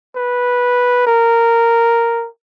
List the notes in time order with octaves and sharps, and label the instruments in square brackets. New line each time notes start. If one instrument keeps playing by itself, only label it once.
[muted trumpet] B4
A#4